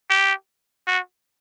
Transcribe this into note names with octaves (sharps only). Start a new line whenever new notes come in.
G4
F#4